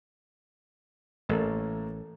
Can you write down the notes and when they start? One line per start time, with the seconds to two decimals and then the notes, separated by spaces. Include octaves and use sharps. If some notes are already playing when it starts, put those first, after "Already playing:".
1.29 A1 A2 A3 A#3